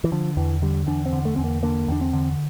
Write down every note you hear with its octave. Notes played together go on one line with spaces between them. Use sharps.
E3
D3 F3
E2 E3
D3 G3
E2 D4
C4
D3
A3
E2 C4
A#3
D3 A#3
E2 D4
C4
D3